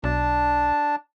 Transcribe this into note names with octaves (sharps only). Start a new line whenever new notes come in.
B1 D4 A5